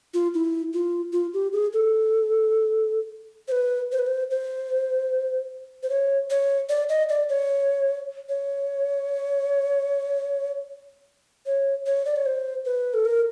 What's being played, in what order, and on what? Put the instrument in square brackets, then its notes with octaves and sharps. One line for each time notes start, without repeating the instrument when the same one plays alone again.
[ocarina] F4
E4
F4
F4
G4
G#4
A4
C5
B4
C5
B4
C5
C5
C5
C#5
C#5
D5
D#5
D5
C#5
C#5
C#5
C#5
D5
C#5
C5
B4
A4
A#4